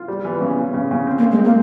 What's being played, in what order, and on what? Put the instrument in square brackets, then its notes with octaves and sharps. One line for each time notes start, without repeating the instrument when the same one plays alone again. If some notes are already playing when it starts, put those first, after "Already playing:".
Already playing: [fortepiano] F4
G3
E3
C#3
C#3
C#3
C#3
C4
[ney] A#3
[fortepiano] C4
[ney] G#3
[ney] A#3 [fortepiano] C4